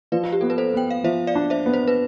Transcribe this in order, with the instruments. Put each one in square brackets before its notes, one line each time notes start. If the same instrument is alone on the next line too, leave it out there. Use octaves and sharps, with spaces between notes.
[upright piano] F3 [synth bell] B4 D5
[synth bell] F4
G4
[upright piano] B3 [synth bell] A4
[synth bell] B4
A4 C5
[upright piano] B3 [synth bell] G5
[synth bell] F5
[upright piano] F3 [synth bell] C5 E5
[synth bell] D5 F5
[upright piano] D4
[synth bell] C5 E5
[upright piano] B3
[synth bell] C5
B4